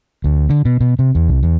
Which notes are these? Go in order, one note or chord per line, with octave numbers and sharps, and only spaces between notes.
D2
D3
B2
B2
C3
E2
C2
E2